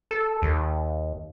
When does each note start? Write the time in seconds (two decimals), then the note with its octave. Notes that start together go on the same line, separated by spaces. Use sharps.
0.11 A4
0.42 D#2